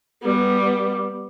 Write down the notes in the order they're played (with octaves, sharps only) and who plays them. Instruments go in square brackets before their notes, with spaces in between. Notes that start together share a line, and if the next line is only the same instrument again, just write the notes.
[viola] G3 B3